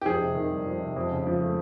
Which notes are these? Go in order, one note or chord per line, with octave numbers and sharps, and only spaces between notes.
G4
F2 G#4
C3
D#3
G3
F2
C3
F2
C#3
F3
A3